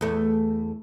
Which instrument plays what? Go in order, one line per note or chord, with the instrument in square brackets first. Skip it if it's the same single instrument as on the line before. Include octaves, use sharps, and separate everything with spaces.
[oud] E2 A3